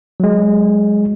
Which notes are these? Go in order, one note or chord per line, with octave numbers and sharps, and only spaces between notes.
F#3 G#3